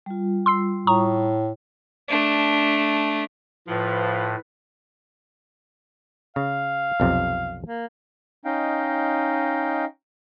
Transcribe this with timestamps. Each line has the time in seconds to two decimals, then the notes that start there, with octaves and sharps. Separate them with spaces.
0.06 G3 F4
0.46 C6 E6 C7
0.87 A2 A#5 C#6 D#6
2.08 A3 D4
3.68 A2 F3 B4
6.36 C#3 F5
7.00 B1 F2 C3
7.64 A#3
8.45 C#4 D#4 D#5 F5 G5